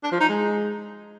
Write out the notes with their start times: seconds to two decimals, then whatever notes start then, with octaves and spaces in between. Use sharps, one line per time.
0.03 D4
0.12 F3
0.20 D#4
0.29 G#3